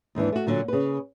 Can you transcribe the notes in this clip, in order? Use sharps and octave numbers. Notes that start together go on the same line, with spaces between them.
D#2 G#2 E3 D4
A3 F#4
A#2 D3 F#3
C#3 B4